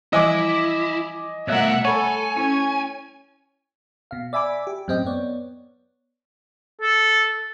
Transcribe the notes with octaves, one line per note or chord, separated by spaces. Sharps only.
E3 F3 G3 E4 D#5 G#5 D6
B2 G3 A3 A#4 C#5 E5 F#5
A4 C#5 F#5 G#5 B5
C#4 E4
B2 F5
D5 E5 G#5 B5 D6
G4
F#2 A2 C4 G4 D#5 G5
B3 C#5 D5
A4